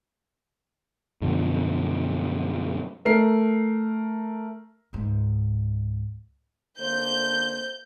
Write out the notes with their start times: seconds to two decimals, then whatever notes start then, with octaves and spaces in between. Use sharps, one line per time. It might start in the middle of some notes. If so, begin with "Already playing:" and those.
1.22 F#2 B2 D3 F3
3.05 A3 A#4 C7
4.93 C#2 G#2
6.79 D3 A#3 C5 G6